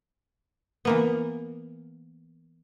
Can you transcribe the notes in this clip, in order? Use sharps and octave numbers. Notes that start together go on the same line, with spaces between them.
E3 A#3 B3